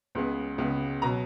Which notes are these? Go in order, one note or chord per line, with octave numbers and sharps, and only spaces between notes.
C#2 C#3 G#3 B3
C#2 C#3 G#3 B3
B2 F#3 A#5